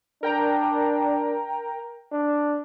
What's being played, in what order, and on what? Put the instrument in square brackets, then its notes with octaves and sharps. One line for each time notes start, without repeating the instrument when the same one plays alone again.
[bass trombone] D4 [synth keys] A#4 G5 A#5
[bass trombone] D4